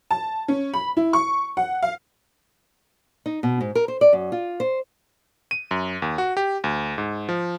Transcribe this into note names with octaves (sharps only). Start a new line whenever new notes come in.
A5
C#4
B5
E4
C#6
F#5
F5
D#4
B2
G#2
A#4
C5
D5
F#2
F4
C5
D#7
F#2
D#2
F#4
G4
D2
G#2
F3